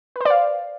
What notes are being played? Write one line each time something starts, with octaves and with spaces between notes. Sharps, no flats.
B4 C5 D5 F5